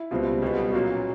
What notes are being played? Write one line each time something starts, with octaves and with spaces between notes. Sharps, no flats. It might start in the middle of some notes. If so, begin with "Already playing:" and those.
Already playing: E4
C#2 B2 G3 C4 F4
B1 B2 G3 B3
A#2 F#3 A#3 C#4 F4 F#4